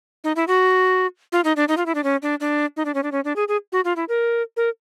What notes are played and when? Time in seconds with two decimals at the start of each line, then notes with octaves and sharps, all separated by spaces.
0.24 D#4
0.36 E4
0.47 F#4
1.32 F4
1.44 D#4
1.56 D4
1.68 D#4
1.77 F4
1.86 E4
1.95 D4
2.04 C#4
2.22 D4
2.40 D4
2.77 D#4
2.85 D4
2.94 C#4
3.03 D4
3.12 C#4
3.24 D4
3.36 G#4
3.48 G#4
3.72 F#4
3.85 F4
3.96 E4
4.09 A#4
4.57 A#4